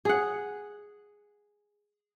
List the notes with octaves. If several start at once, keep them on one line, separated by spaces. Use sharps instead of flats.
G#4 F#5